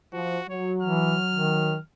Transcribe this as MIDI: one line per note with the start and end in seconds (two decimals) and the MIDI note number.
0.13 0.38 53
0.13 0.49 66
0.49 1.76 54
0.49 0.74 73
0.82 1.16 52
0.82 1.81 89
1.32 1.77 51